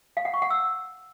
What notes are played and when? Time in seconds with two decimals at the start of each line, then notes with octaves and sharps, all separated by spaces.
0.17 F5
0.25 F#5
0.34 C#6
0.42 F#5
0.50 E6